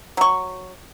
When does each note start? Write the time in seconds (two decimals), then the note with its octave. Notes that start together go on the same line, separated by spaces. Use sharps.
0.17 F#3 C#6